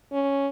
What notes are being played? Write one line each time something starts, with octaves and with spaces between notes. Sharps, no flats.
C#4